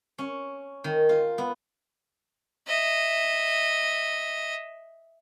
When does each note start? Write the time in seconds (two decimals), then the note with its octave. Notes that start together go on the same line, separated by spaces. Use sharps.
0.18 C#4
0.84 D#3
1.09 F4
1.38 B3
2.67 D#5 E5